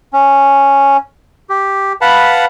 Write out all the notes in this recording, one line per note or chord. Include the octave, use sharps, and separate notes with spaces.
C#4
G4
B4 F5 F#5 A5 B5